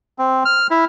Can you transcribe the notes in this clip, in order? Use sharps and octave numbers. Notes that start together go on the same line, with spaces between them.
C4
F6
E4